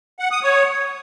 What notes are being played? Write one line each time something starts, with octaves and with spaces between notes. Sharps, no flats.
F#5
D#6
C#5